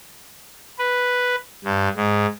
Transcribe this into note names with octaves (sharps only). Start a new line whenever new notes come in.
B4
G2
G#2